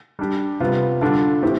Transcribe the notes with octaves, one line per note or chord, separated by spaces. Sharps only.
G3 D4 G4
C3 G3 B3 F4
D3 G3 D4 F4 A4
A2 E3 A3 C4 G4